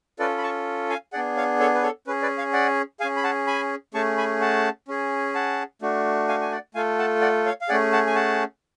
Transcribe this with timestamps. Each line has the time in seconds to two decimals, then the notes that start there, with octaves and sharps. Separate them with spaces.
0.19 C#4 F4 A4 B4 D5
0.38 B5
0.43 A5 C#6
0.90 F5 G#5
1.13 B3 D4 G#4 D5 F#5
1.37 C#5 F5
1.60 A4 C#5
1.74 B4
1.83 A4 C#5
2.07 C#4 G#4 B4
2.22 B4 D5
2.38 C#5 F5
2.53 D5 F#5
3.00 G#4 F5 G#5
3.04 C#4
3.16 B5
3.24 F#5 A5
3.47 G#5 B5
3.94 A3 C#4 G#4 A5 C#6
4.17 G#5 B5
4.41 F#5 A5
4.88 C#4 G#4
5.35 F#5 A5
5.82 A3 D4 F#4
6.28 F5 G#5
6.41 G#5
6.51 D5 F#5
6.75 A3 F4 A4 F5 G#5
6.99 F#5 A5
7.22 D5 F#5
7.46 C#5 F5
7.61 F5
7.69 A3 C#4 G#4 D5 F#5
7.92 F#5 A5
8.07 G#5
8.15 F#5 A5